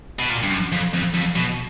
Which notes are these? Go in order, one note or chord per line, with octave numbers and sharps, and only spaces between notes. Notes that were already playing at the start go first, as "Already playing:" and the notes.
B2
A#2
G2
F#2
F2
F2
F2
B2